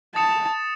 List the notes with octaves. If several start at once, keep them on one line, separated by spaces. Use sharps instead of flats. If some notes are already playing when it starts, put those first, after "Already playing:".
A5 D#6 A6 C#7 E7